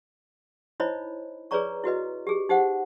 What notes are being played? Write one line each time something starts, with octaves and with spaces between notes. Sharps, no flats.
D#4 E4 C5 C#5 D#5 B5
G#4 B4 C#5 D5 A#5 C#6
E4 F#4 B4 D#5
G4 G#4
D#4 G4 C5 F#5